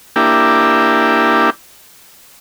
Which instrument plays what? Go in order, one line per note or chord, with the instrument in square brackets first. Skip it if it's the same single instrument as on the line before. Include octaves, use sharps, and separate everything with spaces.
[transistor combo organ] A#3 D4 E4 G4